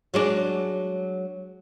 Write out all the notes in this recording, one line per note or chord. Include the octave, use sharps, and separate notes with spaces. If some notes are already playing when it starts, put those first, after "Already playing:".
F#3 G#3 D4